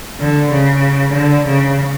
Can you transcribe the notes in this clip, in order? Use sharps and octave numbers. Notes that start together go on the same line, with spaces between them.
D3
C#3
D3
C#3